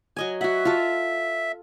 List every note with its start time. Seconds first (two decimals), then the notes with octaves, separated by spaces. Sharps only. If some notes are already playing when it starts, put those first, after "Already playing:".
0.16 F#3 D#5 G#5
0.41 F#4 E5 F#5
0.65 F4 A4